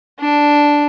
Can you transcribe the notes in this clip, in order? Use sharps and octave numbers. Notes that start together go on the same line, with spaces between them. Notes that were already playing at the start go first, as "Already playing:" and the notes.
D4